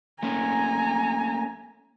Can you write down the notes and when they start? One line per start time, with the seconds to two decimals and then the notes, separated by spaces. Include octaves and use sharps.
0.23 A3 A#3 C#4 G#5 A#5